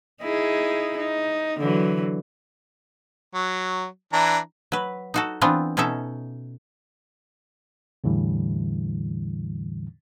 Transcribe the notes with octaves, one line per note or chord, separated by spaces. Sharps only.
D#4 E4 G#4
D#4
D3 E3 F#3
F#3
E3 D4 A#5
F#3 B4
D#4 F#4 A4
E3 B3 C4 D4 F4
B2 C#4 D#4 A4 E5
E2 A2 D3 E3 G3